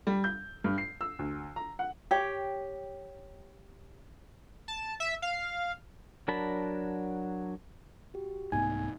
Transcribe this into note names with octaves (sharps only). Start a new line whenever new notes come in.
G3
G6
G2
C7
E6
D2
A#5
F#5
G4 C#5 G5
A5
E5
F5
F#3 D4 A#4 A5 B5
F#4 G4
C2 G#2 A3 B3 D#4 G#5 G#6